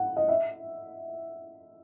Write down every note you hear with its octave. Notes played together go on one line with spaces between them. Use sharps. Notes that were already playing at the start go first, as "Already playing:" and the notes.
Already playing: F#5
D#5
E5